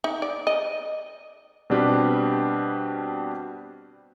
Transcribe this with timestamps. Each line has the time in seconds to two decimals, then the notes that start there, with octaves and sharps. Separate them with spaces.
0.04 D#4
0.22 D5
0.47 D#5
1.70 B2 G3 C4 D4 G4 B4